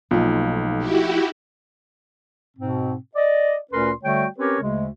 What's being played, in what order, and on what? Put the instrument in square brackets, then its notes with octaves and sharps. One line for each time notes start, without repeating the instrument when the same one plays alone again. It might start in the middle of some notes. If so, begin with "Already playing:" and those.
[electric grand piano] B1 [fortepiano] A#2 [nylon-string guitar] F3 A3 D#4
[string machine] E4 F#4 G4
[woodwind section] G#2 B2 C4
D5 D#5
D2 A#2 C#4 A#4 B4 C6
D3 G3 A3 F#4 C#5 G5
C4 C#4 G4 A#4 B4 C#5
D2 C#3 G#3